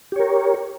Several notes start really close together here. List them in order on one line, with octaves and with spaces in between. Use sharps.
G4 C#5 A#4